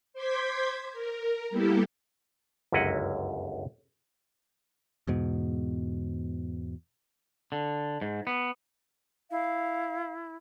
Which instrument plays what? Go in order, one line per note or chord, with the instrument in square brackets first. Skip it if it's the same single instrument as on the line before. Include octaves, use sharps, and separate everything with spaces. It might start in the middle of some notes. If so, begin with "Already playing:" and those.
[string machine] C5 C6 D6 G6 G#6 B6
A#4
G3 A#3 B3 E4 G4 A4
[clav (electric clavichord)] G1 C#2 F#2 E4 D#5 F#5
[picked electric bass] E2 G#2 B2
[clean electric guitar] D3
G#2
B3
[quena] E4 [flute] F5